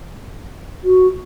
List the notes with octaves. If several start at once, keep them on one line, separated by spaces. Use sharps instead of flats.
F#4